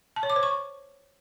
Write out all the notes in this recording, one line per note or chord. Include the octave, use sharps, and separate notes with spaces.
A5
C#5
D6
C5
C#6